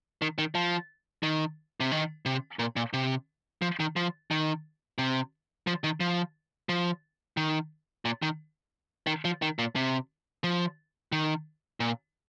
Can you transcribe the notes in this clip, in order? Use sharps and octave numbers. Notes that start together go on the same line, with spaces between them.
D#3
D#3
F3
D#3
C3
D#3
C3
A#2
A#2
C3
F3
D#3
F3
D#3
C3
F3
D#3
F3
F3
D#3
A#2
D#3
D#3
F3
D#3
A#2
C3
F3
D#3
A#2